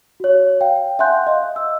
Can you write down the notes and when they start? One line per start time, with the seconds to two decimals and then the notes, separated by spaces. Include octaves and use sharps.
0.20 F#4 C#5
0.61 F5 G5
0.99 E5 F#5 G#5 C6 F#6 G6
1.27 D#5 F5
1.56 E6